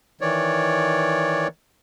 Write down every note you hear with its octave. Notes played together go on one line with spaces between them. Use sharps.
D#3 E3 C#5 D5